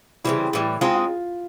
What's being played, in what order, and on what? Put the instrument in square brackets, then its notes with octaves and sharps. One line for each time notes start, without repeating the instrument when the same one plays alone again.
[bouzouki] C#3 E3 G3 C4 [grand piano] E4
[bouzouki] A2 E3 G3
[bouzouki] G#3 C4 D#4 [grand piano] F4
[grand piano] F4